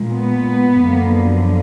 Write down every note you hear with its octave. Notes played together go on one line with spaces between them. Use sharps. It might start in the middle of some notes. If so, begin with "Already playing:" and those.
Already playing: A#2 G#3
B3
F#2 D3 F3 A#3